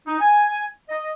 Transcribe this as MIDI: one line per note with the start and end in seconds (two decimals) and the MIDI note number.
0.07 0.20 63
0.20 0.64 80
0.89 1.11 75